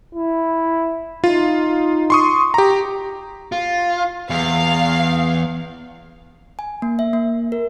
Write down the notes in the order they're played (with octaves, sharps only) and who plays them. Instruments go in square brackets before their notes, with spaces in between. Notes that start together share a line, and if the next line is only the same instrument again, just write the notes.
[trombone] E4
[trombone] D#4 [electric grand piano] F4
[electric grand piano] C6 C#6 D#6
G4 A#5
[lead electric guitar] F4
[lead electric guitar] E2 [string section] F5
[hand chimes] G#5
A#3
E5
A#3
A#4